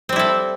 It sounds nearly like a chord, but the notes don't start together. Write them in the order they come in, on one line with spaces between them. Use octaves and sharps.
C4 G3 E4 A4